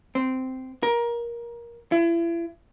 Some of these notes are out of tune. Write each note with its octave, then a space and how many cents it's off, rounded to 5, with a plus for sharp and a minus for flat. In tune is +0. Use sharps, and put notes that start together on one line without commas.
C4 -10
A#4 +20
E4 +35